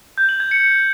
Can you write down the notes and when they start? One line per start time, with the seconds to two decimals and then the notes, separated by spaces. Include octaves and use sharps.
0.18 G6
0.29 F#7
0.40 G#6
0.51 C#7